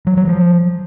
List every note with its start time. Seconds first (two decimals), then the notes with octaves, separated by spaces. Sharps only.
0.07 F#3
0.17 F#3
0.27 F3